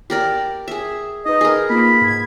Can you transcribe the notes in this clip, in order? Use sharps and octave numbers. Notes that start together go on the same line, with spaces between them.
G4 A#4 D5
G#4 E5
D#4 B4 D#5
G#4 A#4
A#3 F4 B5
G#2 G#6